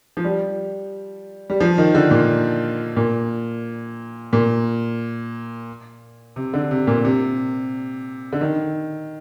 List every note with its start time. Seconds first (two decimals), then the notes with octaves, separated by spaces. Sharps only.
0.17 F3
0.24 G3
1.50 G3
1.60 F3
1.78 D#3
1.95 D3
2.11 A#2
2.97 A#2
4.33 A#2
6.36 C3
6.54 D3
6.71 C3
6.87 A#2
7.05 C3
8.32 D3
8.41 D#3